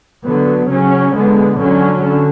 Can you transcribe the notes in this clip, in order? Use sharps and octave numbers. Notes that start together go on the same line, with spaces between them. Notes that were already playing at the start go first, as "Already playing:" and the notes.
D3 F#3 B3
C#3 F#3 C#4
D3 G#3 B3
D3 F#3 C#4
D3